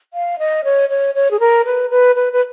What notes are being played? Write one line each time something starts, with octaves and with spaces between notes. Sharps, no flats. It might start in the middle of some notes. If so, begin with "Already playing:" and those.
F5
D#5
C#5
C#5
C#5
G#4
A#4
B4
B4
B4
B4